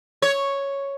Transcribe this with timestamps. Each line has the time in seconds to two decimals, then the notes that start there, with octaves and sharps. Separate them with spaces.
0.22 C#5